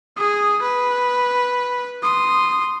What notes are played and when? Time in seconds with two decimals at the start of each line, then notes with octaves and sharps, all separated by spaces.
0.17 G#4 D#6
0.62 B4
2.03 C6 D#6